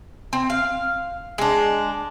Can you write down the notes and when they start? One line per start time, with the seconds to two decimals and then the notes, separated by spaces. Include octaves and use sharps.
0.33 C4
0.50 F5
1.38 G#3 D4